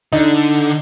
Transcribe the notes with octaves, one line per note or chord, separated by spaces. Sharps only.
D3 D#4